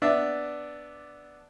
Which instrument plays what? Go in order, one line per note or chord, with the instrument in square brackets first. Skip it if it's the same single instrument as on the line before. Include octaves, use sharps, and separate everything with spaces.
[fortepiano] B3 D4 D5 E5